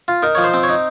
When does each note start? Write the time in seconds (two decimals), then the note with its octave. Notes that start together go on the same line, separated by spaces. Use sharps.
0.08 F4
0.23 D#4 A#4
0.35 F3 C#5
0.44 C5
0.54 C4
0.63 C#5
0.69 D#4